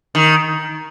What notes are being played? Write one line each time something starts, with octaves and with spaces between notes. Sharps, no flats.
D#3